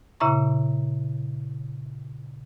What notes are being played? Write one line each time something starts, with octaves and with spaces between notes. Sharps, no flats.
A#2 C#3 E4 E5 A#5 C#6